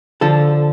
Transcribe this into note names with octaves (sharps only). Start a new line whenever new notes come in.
D3 F3 A4